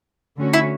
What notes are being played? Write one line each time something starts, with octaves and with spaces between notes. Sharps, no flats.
D3 A3 C#4 F#4
E4